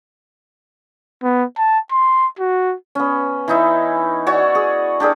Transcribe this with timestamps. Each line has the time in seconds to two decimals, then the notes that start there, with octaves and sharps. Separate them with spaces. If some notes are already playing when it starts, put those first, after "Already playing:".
1.23 B3
1.58 A5
1.91 C6
2.39 F#4
2.95 B3 C#4
3.48 E3 D#4 E4
4.27 F#4 C#5 D5 F#5
4.55 G#4
5.00 D4 G4 G#4 A#4